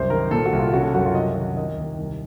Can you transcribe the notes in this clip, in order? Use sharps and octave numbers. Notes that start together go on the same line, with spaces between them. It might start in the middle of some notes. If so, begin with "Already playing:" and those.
Already playing: C2 F#2 C5
D#3 A#4
A#2 A4
F#4
C2
F4
C#3 F#4
A4
F#2 F#4
F4
C2 D#5
D#3 D#5
D#3 D#5
D#2
C2